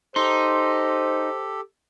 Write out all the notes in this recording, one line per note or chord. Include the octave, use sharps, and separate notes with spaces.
D#4 G4 A4 C5 C6